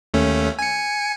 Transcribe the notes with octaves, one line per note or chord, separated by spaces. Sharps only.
D#2 A3 C#4
G#5 C#7